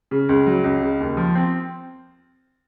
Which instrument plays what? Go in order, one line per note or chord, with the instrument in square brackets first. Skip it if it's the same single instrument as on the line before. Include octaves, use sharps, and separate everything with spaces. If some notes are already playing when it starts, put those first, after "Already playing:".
[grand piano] C#3
C#2
F#3
C#2
C#3
D#2
F3
C4